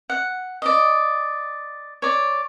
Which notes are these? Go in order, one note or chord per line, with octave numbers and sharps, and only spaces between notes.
F#5
D5 D#5
C#5 D5